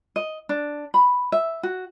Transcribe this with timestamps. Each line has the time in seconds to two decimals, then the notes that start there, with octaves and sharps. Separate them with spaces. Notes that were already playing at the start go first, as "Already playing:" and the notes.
0.16 D#5
0.49 D4
0.94 B5
1.32 E5
1.63 F#4